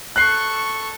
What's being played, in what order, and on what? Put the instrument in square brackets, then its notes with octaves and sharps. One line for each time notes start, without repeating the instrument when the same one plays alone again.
[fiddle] A4 C#6 [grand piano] F#6 C7